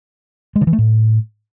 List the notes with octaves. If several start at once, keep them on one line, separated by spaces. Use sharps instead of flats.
G#3
D3
E3
A3
A2